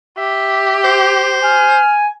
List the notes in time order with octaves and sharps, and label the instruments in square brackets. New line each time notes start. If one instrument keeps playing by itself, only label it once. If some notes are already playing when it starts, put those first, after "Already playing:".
[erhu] G4 [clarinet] E5
[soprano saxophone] C5
[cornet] G#5 [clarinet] F6